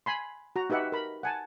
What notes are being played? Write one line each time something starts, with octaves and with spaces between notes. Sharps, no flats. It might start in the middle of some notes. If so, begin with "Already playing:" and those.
G#5 B5 C6
F#4 A#5
D#4 G4 B4 E5 F#5
A#4 B5
F#5 G#5 A5